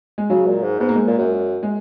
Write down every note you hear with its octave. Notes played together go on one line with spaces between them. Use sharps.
G#3
C#3 F#3
A#2
G#2
G#2 B3
A#3
G#3
A#2
F#2
G#3